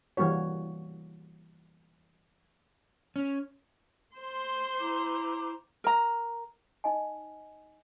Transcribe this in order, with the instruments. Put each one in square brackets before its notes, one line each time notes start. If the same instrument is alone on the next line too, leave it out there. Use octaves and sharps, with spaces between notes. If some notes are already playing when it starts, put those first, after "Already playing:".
[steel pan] E3 G3 A#3 F#4 C#5
[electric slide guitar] C#4
[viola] C5 C6
[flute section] E4 A#5 D6
[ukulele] A#4 A#5
[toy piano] D#4 D#5 G#5